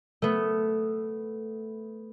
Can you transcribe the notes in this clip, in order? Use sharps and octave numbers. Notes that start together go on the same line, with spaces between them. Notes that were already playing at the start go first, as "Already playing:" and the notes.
A3 B3